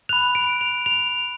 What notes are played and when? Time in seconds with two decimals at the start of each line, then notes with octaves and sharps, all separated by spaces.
0.09 B5 F#6 F7
0.35 D7
0.61 F7
0.86 F7